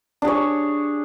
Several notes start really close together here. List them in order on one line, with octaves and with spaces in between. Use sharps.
D4 G#4 C#5